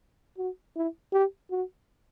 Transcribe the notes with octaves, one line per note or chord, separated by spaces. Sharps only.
F#4
E4
G4
F#4